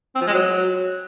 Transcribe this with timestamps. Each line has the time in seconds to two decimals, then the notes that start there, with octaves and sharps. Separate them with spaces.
0.15 C4
0.21 F3
0.27 G#3
0.33 F#3